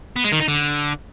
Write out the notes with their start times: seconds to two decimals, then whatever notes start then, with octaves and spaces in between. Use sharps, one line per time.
0.16 B3
0.24 G#3
0.32 D#3
0.40 D#4
0.48 D3